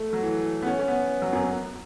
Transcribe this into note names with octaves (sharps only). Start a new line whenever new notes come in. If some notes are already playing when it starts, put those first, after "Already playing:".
Already playing: A3
F#3
E3
B3
C#4
C#4
B3
F#3
F#2
F#2